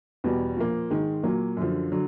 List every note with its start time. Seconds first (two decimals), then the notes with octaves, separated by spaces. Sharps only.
0.24 E2 B2 G3
0.57 A#2 F3 A#3
0.90 G#2 D#3 G#3
1.23 A#2 F#3 A#3
1.57 F#2 D3 F3
1.92 D3 F#3